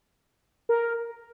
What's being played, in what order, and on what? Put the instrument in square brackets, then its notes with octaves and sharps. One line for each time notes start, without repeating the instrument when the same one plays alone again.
[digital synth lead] A#4